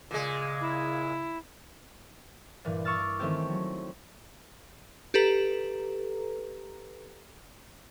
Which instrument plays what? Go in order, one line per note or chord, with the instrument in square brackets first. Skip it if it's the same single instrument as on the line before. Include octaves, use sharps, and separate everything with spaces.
[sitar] A#2 G#3 [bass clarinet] C#3
[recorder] E4
[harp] G2 A#2 E3
C#6 D6 E6 F6 A6
D#3 E3 A3 C4 C#4 G4
F#3
[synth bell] G4 A4 B4 A#5